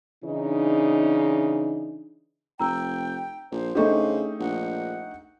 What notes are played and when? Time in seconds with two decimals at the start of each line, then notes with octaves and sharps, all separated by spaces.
0.24 C#3 E3 D4 D#4
2.59 F1 G5 A#5 E6
3.52 A#1 C5
3.75 C#3 A3 D4 D#4 G4 A4 C#6
4.40 A#1 F#5